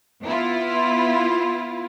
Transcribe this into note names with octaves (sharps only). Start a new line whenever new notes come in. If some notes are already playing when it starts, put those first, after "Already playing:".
B3 E4 F4